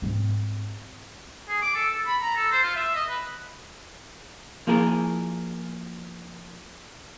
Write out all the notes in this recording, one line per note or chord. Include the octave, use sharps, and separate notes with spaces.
G#2 C4
G#4
D6
A4
A4
B5
A#5
A4
C5
F4
E5
D#5
B4
F3 A#3 E4 G#4 A#4